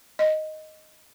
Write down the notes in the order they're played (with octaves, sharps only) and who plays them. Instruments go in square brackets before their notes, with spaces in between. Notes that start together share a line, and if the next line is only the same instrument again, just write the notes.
[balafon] D#5